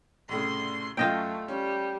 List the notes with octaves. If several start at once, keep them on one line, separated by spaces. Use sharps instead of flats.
C2 A2 C#3 C6
F#2 A3 F4 D#5 G5
G3 C#4